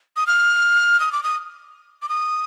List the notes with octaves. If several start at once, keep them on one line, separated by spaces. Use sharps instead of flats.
D#6
F6
D#6
D6
D#6
D6
D#6